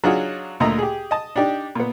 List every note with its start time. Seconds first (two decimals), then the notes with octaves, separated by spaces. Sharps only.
0.04 F#3 D4 D#4 F4 F#4 G#4
0.60 D2 A#2 A3 D#5 A#5
0.78 G4 G#4
1.11 D#5 A5
1.36 D4 D#4 G4 D5
1.75 A#2 B3